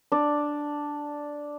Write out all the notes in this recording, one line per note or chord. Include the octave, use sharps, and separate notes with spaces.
D4 D5